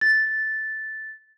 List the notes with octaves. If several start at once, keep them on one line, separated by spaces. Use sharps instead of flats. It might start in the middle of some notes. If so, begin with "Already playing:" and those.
A6